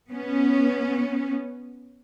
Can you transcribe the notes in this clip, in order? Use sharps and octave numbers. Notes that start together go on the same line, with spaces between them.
B3 C#4